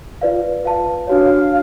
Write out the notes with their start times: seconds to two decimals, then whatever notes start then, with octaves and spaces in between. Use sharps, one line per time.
0.21 F4 B4 D5 F5
0.64 B4 F5 A5
1.07 D4 F#4 C#5 F5